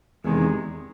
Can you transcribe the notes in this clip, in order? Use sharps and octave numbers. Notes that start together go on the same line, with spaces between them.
E2 C3 D#3 G#3